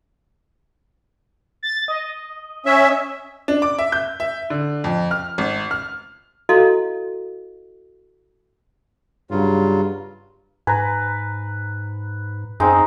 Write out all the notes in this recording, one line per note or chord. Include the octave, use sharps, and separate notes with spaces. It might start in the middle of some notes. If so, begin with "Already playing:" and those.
A6
D#5
C#4 E5
D4
D6
E5
G6
E5
D3
F2
F6
G#1
F6
E4 F#4 A4 D#5 F5
G2 C#3 F#3 F4
G#2 B4 G#5 A#5
F#2 G#3 C4 D#4